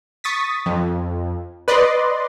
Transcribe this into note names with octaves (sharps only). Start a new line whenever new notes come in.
C#6 D#6 A6 B6
F2
B4 D5 D#5 C6